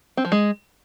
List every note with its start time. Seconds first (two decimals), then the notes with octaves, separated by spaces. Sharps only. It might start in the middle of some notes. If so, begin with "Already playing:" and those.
0.17 C4
0.25 F3
0.32 G#3